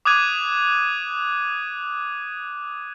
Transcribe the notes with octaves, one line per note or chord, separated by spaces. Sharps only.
D6 D#6 F#6 G#6 D#7